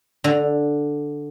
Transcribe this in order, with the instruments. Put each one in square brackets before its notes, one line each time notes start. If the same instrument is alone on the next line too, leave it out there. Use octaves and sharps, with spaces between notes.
[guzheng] D3